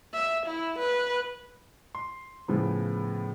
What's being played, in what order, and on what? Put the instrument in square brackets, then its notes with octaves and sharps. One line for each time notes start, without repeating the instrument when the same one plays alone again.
[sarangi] E5
E4
B4
[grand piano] C6
A2 C#3 F3 B3